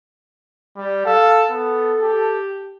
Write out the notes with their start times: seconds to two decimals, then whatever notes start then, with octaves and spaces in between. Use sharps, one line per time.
0.77 G3
1.06 A4 F5
1.50 B3 A4
2.02 G4